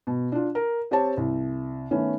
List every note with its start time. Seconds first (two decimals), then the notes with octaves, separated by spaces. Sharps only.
0.07 B2
0.32 D4 F4
0.55 A#4
0.91 C4 G4 C5 C#5 A5
1.17 C2
1.91 D#3 A3 B3 C#4